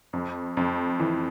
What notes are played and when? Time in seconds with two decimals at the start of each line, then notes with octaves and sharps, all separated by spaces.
0.13 F2
0.57 F2
1.00 E3